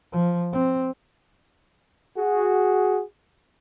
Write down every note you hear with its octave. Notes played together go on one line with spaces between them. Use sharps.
F3
C4
F#4 G#4